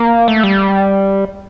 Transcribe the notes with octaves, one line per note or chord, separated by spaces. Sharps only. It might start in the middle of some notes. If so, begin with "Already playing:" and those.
Already playing: A#3
A3
G3